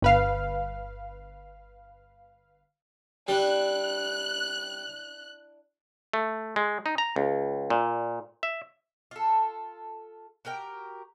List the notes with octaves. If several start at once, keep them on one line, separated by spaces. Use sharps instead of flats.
G1 B4 F5
G3 D4 E4 F#6
A3
G#3
D#4
A#5
C#2
A#2
E5
F4 A4
F#4 G4 A#4 G5